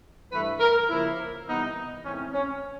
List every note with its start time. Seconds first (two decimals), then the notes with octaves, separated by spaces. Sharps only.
0.31 G2 E3 A3 B4
0.60 A#4
0.89 C#3 F3 A#3 E4
1.47 C3 E3 G3 B3 D#4
2.04 G#2 E3 A3 C4 C#4
2.33 C#4